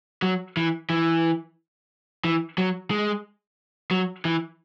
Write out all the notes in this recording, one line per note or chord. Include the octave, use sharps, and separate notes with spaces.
F#3
E3
E3
E3
F#3
G#3
F#3
E3